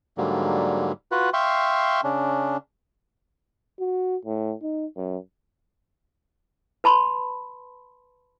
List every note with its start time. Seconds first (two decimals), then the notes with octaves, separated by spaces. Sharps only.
0.18 G#2 D3 F#3 G3 A#3
1.12 F4 F#4 B4 F#5
1.33 E5 F5 G5 C6 C#6
2.04 C#3 C#4 D4
3.80 F#4
4.25 A2
4.62 D#4
4.97 F#2
6.84 B4 A5 B5 C6